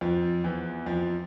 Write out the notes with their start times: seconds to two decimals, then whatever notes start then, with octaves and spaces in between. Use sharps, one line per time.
0.01 F2 F3
0.44 E2 E3
0.86 F2 F3